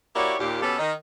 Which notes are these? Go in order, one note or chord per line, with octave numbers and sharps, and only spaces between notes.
A#3 E4 F#4 G4 C#5 D5
D#2 A#2 G4
B2 B3 C#4 G4 A4
D#3 D#5